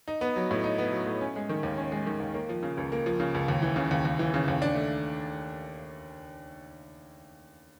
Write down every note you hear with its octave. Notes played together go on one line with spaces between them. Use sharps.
D#4
B3
F#3
A2
D#4
B3
F#3
A2
C#4
G#3
D#3
D#2
C#4
G#3
D#3
D#2
A#3
F3
C#3
C#2
A#3
F3
C#3
C#2
D#2
E3
C#3
D#2
D#2
E3
C#3
D#2
D4
A3